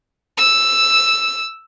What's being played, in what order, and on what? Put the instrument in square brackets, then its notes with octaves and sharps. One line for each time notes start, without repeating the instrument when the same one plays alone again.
[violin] E6